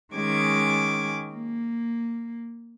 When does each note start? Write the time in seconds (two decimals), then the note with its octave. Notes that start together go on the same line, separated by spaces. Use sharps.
0.15 D#3 G#3 C#4 D6 G#6
1.33 A#3